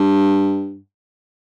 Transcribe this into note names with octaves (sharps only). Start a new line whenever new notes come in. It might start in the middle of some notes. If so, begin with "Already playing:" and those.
Already playing: G2